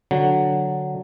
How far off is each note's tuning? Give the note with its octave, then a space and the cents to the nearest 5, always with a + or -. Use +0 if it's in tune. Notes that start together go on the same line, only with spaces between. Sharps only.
D3 +0 F#3 +0